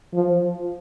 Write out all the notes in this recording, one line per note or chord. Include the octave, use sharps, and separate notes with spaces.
F3